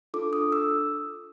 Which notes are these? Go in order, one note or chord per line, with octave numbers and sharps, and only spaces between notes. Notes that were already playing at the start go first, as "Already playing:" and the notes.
D4 F4 A4 D6
D#6
E6